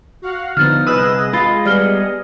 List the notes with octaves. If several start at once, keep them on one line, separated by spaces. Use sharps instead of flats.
F#4 F5 F#5
D3 F3 B3 D#4 F6 A6
C2 G#4 B4 D#5 D#6 E6 F#6
G#3 F4 B5 A6 C7
G3 B3 D5 F6 G7